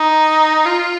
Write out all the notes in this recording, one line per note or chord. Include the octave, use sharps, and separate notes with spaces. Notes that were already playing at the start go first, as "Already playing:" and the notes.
Already playing: D#4
F4